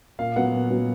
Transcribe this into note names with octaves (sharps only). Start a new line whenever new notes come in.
A#2 F5
F#3 B3 F#5
A#2
F#3 B3